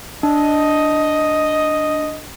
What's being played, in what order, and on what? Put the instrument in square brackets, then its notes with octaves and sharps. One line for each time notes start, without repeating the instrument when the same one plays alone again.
[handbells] D4 [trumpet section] D#5